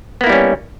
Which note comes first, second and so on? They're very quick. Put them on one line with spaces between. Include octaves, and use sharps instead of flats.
B3 A#3 E4 G3 C#4